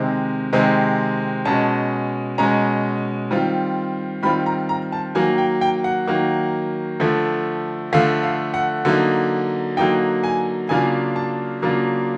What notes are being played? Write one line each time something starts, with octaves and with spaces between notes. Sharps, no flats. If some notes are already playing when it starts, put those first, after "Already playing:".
Already playing: C3 D#3 G#3 C4
C3 D#3 G#3 C4
B2 G#3 C#4 A5
B2 G#3 C#4 A#5
D#3 G3 C4 F4
D#3 G3 C4 F4 B5
A#5
A#5
A5
D#3 F#3 A#3 G#5
G5
G5
F#5
D#3 F#3 A#3
D3 F3 A3
D3 F3 A3 F5
F5
F#5
D3 F#3 A#3 D#4
D3 F#3 A#3 D#4 G5
G#5
C#3 F#3 A#3 D4 F4 G#5
A5
C#3 F#3 A#3 D4 F4